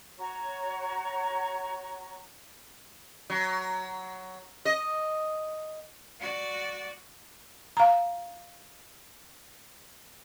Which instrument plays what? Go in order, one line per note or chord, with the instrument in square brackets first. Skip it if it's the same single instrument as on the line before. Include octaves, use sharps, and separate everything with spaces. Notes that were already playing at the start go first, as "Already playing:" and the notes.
[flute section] F#4 C#5 A#5 C#6
[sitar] F#3
D#5
[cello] F#4 D5
[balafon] F5 A#5